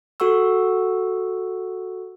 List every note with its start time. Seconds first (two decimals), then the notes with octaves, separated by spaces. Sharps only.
0.20 F#4 A4 F#5 C#6 E6